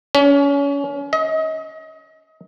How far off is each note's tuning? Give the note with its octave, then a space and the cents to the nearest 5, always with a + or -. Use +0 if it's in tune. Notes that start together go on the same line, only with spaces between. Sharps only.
C#4 +30
D#5 +30